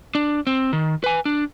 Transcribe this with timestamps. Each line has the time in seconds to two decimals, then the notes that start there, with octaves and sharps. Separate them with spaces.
0.15 D4
0.47 C4
0.73 D#3
1.04 B4 G#5
1.25 D4